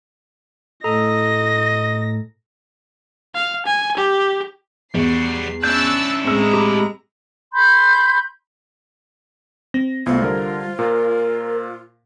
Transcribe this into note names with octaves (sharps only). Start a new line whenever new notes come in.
A2 A4 D#5 A#5 A#6
F5
G#5
G4
E2 G3 F#4 C7
C#4 D4 E4 E6 F#6 G6 A6
A2 G#3 C4 A#5 E6
G4 B5
B5 C6 G6
C4 A#6
C2 A3 B3 F4 C5 G#6
D3 G3 A#4
A#2 A#4